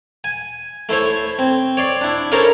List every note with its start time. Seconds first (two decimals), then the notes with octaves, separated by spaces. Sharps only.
0.24 G#5
0.89 A3 E4 C5 C#5
1.39 C4
1.77 C#5 D5 C6
2.01 D4 E4
2.32 C#4 E4 A4 A#4 C5 C#5